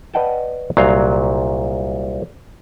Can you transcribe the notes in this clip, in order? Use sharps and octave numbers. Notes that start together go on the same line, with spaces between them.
B4 D5 D#5 F#5 G5 A5
C2 A#2 F#3 F5